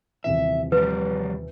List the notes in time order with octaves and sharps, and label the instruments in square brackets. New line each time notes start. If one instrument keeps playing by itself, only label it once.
[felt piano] D#1 C3 E3 [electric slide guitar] E5
[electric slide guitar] F3 G3 [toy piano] B4